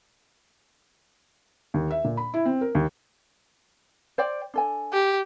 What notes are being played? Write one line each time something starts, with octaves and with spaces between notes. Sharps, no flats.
D#2
E5
A#2
B5
E4
C4
A#4
D#2
C5 D5 G5
D4 A4 G#5
G4